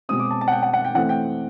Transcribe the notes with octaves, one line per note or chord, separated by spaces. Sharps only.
B2 G#3 C4 D#6
D6
A5
A5
F#5
G5
F#5
F#5
G5
E3 A3 C4 F#5
G5